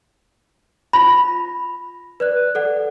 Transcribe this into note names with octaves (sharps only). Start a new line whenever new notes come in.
F4 B5 A#6
B4 D5 F#6
A4 D5 F#5